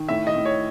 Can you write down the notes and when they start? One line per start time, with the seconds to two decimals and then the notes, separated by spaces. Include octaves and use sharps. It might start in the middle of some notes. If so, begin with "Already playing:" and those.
Already playing: D#3
0.08 A2 E5
0.27 D#5
0.37 A2
0.45 C#5